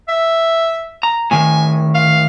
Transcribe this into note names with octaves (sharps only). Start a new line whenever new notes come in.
E5
A#5
A2 D#3 G#5
F5